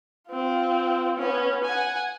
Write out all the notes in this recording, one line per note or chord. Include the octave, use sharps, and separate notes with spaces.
C4 F4
B3 C#4
F#5 G#5